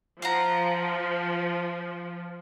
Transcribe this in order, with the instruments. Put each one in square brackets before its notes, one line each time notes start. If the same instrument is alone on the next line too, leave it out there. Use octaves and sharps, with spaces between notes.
[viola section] F3 [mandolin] F5 F#5 A#5